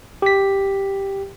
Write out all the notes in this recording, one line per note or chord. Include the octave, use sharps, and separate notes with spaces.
G4 B6